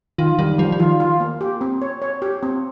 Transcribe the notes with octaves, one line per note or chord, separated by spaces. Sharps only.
D#3 F4
D#3 G3
F3 G3
F3
D#3 F4
F4
A#3
G4
C4
C#5
C#5
G4
C4